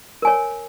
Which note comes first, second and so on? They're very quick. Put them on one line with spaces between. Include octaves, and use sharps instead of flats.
A#4 G#5 C#5